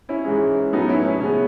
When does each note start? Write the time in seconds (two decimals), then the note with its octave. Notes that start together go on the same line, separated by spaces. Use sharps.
0.09 C#4 E4
0.24 G#2 E3 G#3
0.72 A2 F#3 A3 B3 D#4
0.89 C#4 E4
1.05 C#4
1.20 C#3 G#3 B3 C#4